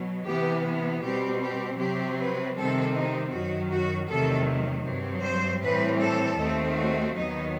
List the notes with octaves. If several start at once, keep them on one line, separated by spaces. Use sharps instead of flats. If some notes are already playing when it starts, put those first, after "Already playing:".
Already playing: B2 F#3
C3 E3 B3 G4
B2 G3 C4 G4
G4
C3 F#3 C4 G4
B4
C3 D#3 G3 C4 A4
D#4
F#2 D#3 F#3 F#4
F#4
E2 C3 D#3 F#3 A3 A4
G2 F#3 C4
C5
A2 E3 G3 C4 B4
A4
D#2 D#3 A3 C4
F#4
D#2 D#3 F#3 B3 D#4